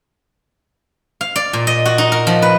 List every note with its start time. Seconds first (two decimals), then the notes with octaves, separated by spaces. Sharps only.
1.21 F5
1.36 D5
1.53 A#2
1.67 D#5
1.85 F#4
1.98 D#4
2.12 A#4
2.27 F3
2.42 B4